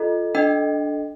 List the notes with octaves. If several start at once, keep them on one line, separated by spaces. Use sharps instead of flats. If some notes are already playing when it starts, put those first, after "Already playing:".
Already playing: F4 A4 D#5
D4 A4 D#5 G5